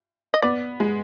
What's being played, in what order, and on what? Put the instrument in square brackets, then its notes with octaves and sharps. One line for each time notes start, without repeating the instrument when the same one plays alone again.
[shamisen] D#5
[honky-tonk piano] B3 [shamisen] D5
[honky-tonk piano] G#3